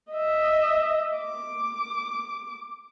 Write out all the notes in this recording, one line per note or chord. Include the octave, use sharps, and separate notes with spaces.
D#5 E5
D6